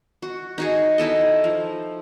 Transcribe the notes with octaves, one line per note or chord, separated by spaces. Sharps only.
F#4
D#4 F#4 G#4
D#4 E4 A4 D#5
F3